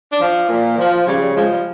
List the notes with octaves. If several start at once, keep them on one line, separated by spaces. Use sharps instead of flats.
D4
F3
A#2
F3
C#3 G3
G3
F3 G#3
G3